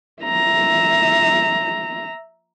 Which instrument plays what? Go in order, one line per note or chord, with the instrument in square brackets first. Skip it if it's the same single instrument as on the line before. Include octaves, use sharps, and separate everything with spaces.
[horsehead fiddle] E5 A#5